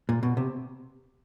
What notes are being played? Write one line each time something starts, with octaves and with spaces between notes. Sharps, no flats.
A#2
B2
C3